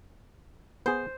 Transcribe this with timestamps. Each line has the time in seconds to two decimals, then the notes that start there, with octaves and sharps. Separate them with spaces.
0.86 B3 G#4 C5